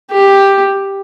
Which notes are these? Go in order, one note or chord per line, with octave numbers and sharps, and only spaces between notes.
G4